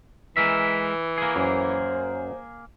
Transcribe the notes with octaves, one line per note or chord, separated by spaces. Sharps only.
E3 G#3 A#4 E5
A#3 G#4
F#2 C5